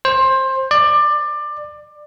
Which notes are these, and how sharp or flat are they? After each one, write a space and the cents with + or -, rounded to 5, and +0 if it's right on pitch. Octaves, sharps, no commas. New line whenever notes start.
C5 +20
D5 +20